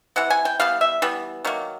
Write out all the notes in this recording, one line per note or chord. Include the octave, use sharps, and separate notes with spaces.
C3 E3 F#5
G#5
G5
E3 G3 B3 F5
E5
E3 G3 B3
D#3 F#3 A#3